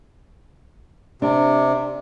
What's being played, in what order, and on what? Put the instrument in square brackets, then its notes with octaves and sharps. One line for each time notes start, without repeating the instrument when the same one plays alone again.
[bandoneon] C3 [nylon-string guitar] D4